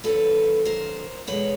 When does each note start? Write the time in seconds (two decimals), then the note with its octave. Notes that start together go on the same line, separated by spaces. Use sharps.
0.04 D#2 D3 F#3 A4 B4
0.65 A#4 C5
1.27 E2 B2 G#3 B4 C#5